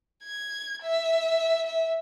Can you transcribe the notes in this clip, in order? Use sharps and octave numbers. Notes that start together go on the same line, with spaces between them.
G#6
E5
E5